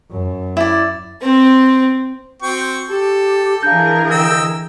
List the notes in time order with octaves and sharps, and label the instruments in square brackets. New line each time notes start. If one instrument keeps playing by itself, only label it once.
[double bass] F#2
[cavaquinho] E4 D5
[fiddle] C4
[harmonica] C4 G5 C#6 [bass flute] F#4
[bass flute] G4 [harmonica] A4
[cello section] E3 G#4 A#4 [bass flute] D4 [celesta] F5 G6
[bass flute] D3 [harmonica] D#5 G5 E6